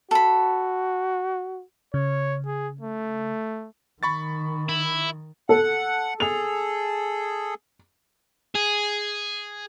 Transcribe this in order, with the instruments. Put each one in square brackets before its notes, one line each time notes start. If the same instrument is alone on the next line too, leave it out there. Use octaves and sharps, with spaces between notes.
[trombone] F#4 [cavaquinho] A4 B5
[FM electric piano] C#3 [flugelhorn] C#5
[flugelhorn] G#4
A3
[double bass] D#3 [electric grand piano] B5 C#6 A6
[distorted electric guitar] E4
[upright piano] A4 [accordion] F#5
[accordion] G#4 A4 [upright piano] F7
[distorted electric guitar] G#4